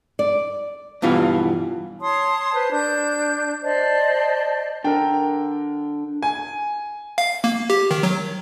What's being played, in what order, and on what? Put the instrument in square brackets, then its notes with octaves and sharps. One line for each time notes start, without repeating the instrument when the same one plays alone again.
[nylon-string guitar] D5
[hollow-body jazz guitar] G2 B2 E3 F4
[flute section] C#5 A5 C6 D#6
B4 C5 A5
D4 G6
C5 D5 D#5 A5
[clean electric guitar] D3 [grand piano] A#4 G5
[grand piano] G#5
[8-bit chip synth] F5
A#3
G4
D#3
F#3